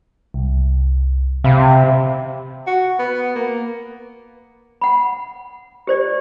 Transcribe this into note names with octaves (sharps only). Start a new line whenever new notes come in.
C2
C3 E5 F5 B5
F#4
B3
A#3
F#5 B5
G4 C5 D5